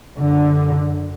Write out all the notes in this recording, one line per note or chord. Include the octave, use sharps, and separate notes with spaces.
F#2 D3